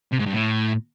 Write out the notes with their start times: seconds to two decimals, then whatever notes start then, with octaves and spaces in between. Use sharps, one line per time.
0.12 C3
0.19 G#2
0.26 G2
0.33 A2